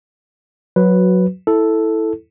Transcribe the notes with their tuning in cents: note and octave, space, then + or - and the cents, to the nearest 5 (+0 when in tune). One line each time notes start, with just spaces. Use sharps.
F#3 -10 F#4 +0 B4 +0
E4 -10 A4 +0